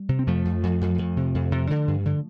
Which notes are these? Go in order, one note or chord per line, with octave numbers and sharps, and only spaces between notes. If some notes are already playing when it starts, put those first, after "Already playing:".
Already playing: G3
C3
C4
F2 F3 A3
F2
F2
F2
F2
C3
F2
C3
D3
G2
D3